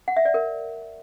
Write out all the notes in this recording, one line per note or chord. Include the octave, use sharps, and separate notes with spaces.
F#5
E5
D5
A#4